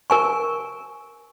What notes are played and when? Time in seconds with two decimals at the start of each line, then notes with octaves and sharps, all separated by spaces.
0.10 A#4 G#5 C#6